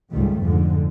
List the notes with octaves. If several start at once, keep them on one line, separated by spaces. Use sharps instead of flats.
C#2 G#2 D#3 G3 A3
F2 G#2 D3 F3